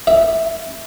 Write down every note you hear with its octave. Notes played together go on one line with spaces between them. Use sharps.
E5